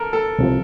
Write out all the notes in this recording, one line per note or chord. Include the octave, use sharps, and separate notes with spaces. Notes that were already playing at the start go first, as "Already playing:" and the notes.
Already playing: A4 A#4
A4
C2 C3 F3